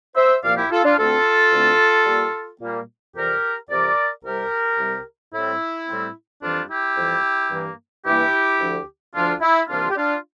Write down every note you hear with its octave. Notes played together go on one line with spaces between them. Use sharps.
C5 E5
C2 A#2 F3 A#3 D5 F5
E4 G4
F4 A4
D4 F4
D2 D3 A3 C4 F4 A4
D2 D3 A3 C4
A#2 G3 A#3
A#2 G3 A#3
F2 C3 E3 G3 G4 A#4
F2 C3 E3 G3 A#4 D5
C2 C3 G3 G4 A#4
C2 C3 G3
A2 G3 C4 E4
A2 G3 C4
F2 E3 G3 D4 F4
E4 G4
F2 E3 G3
G2 E3 A#3
G2 E3 A#3 E4 G4
D2 D3 F3
D2 D3 F3 D4 F4
E4
C2 C3 E3 A#3 D4 F4
G4
D4 F4